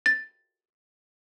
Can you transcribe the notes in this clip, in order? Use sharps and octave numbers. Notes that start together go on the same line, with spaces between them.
A6